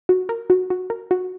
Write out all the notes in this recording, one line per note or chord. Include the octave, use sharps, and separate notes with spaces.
F#4
A#4
F#4
F#4
A#4
F#4